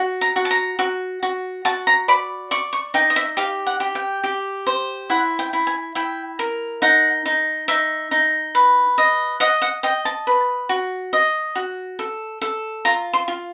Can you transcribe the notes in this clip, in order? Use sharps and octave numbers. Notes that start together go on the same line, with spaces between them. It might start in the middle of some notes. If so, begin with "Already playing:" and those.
Already playing: F#4
A#5
F#4
A5
A#5
F#4
F#4
F#4 A5
A#5
D5 B5
D5 C#6
C#6
D#4 G5
D#5
E5
G4 F5
F#5
G4
G5
G4
C5
E4 F#5
G5
E4
G#5
E4 G5
A#4
D#4 F#5
D#4
D#4 E5
D#4
B4
D#5
D#5 F#5
F#5
D#5 G5
A5
B4
F#4
D#5
F#4
A4
A4
F4 A#5
C6
F4